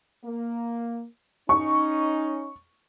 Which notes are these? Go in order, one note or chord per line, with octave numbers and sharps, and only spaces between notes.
A#3
C#4 D#4 C#6